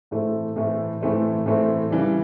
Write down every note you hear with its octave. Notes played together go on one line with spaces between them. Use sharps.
A2 E3 A3 C4
A2 E3 A3 C4
A2 E3 A3 C4
A2 E3 A3 C4
C#3 E3 G3